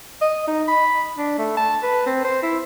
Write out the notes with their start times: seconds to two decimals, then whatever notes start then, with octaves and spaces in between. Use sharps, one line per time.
0.21 D#5
0.47 D#4
0.68 B5
1.18 D4
1.38 A3
1.57 A5
1.83 B4
2.06 C4
2.24 C5
2.43 E4